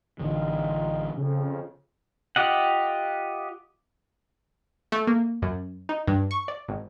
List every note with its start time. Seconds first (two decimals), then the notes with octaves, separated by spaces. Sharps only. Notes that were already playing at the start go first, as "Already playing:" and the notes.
0.19 A1 D3 E3 G3 D#4 F4
1.17 F2 C#3
2.36 F4 G4 D#5 F#5
4.92 A3
5.07 A#3
5.42 F#2
5.89 D#4
6.07 G2
6.31 C#6
6.48 D5
6.68 G#1